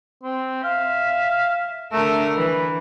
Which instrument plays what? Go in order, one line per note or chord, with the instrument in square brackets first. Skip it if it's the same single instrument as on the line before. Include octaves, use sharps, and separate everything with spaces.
[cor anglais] C4
[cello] E5 [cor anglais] F5
[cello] D3 A#4 [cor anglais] A3
[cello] E3 [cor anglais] B4